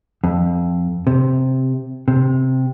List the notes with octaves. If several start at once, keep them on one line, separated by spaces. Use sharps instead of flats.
F2
C3
C3